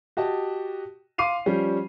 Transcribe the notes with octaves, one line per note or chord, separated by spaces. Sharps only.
F#4 G4 D#5 A5
F5 C6 D6 C7 D#7 F7
F3 G3 C#4